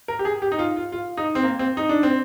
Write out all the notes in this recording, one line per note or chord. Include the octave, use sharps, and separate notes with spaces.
A#4
G4
G#4
G4
D#4
F4
F4
F4
D#4
C4
A#3
C4
D#4
D4
C4